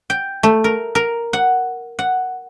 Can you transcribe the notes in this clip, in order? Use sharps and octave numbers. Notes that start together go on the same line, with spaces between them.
G5
A3
A#4
A#4
F#5
F#5